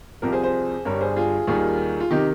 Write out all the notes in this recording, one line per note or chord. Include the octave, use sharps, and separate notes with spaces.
C2 C3 F3 G4 A#4
G#4 C5
G#4 C5
G1 G2 G3 A#4 C#5
G#4 C5
F4 G#4
D#2 D#3 G3 F4 G#4
F4
C3 D#3 D#4 G4